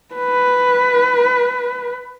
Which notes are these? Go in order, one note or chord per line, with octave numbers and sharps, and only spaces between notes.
B4